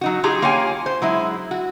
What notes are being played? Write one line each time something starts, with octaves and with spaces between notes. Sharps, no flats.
F#3 D#4 F#4
D#4 F4 G4 G#4
A#3 F4 C#5 G5 G#5
C5
F#3 G#3 E4
F#4